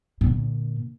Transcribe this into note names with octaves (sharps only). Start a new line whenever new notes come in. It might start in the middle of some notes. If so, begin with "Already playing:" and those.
A#2 D3